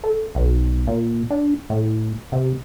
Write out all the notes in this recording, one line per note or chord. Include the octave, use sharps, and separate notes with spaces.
A4
B1
A#2
D4
A2
C3